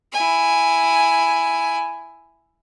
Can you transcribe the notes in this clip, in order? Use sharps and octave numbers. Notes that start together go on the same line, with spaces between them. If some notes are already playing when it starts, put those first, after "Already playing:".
E4 G#5